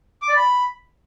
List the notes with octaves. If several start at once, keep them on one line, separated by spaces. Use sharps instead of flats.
D6
D5
B5